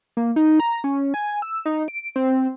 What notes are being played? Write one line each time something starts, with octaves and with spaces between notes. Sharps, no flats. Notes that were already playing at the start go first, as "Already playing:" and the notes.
A#3
D#4
A#5
C#4
G#5
E6
D#4
D7
C4